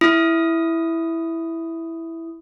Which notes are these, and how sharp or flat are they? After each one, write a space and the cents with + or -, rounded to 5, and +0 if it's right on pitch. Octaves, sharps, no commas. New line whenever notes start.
E4 +0 D#6 +0